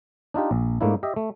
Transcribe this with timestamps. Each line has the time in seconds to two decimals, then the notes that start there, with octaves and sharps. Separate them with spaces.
0.34 D4 D#4 F4 G4
0.51 A#1
0.81 G#2 A3 A#3 D4 E4
1.03 G4 D#5 E5
1.16 A3